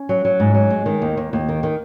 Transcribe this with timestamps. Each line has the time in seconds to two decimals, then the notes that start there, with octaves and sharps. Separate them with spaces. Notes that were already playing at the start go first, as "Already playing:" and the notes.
Already playing: C#4
0.09 F#3
0.25 F#3
0.40 G#2
0.54 F#3
0.70 G#3
0.86 D#3
1.02 D#2
1.17 D#2
1.33 D#2
1.48 D#3
1.63 D#3